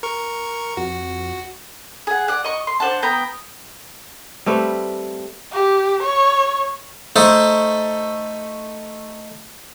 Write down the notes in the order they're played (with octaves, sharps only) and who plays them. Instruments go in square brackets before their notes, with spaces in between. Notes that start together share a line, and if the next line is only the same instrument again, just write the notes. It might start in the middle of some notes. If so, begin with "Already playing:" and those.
[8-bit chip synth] A#4 C#6
[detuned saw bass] F2 [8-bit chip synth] F#4
[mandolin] G#4 F#5
D5 F#5
D#5 C#6
C6
D4 C5 F#5 A5
B3 G5 A#5
[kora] G3 A3 C4 B4
[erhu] G4
C#5
[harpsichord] A3 D#4 A4 C5